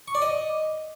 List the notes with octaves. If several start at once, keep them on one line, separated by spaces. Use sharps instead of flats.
C#6
D5
D#5